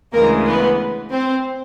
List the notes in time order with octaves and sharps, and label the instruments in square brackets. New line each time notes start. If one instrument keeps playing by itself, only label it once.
[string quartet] D2 C#3 E3 G#3 [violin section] A#3 A#4
[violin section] B3 B4
C4 C5